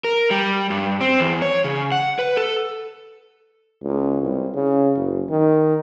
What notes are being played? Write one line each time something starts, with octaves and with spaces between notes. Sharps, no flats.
A#4
G3
G2
C4
E2
C#5
C#3
F#5
B4
A4
C#2
C2
C#3
F#1
D#3